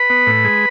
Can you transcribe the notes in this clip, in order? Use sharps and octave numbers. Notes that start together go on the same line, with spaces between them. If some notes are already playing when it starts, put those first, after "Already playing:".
Already playing: B4 B5
B3
A2
G#3